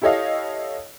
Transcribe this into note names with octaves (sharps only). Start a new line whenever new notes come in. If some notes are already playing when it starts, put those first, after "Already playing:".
E4 G4 A4 C#5 D#5 F5